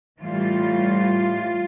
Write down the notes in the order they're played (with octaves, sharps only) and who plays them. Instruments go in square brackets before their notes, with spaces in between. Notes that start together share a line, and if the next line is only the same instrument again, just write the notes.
[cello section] A2 E3 G3 F4